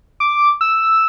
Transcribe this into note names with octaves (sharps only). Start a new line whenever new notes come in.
D6
E6